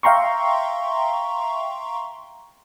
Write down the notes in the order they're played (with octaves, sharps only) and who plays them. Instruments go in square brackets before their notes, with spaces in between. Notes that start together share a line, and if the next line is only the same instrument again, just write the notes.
[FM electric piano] E5 F5 G5 A#5 C6 C#6